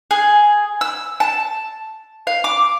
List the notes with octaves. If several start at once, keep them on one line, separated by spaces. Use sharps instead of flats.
G#4
E6
A5
F5
D6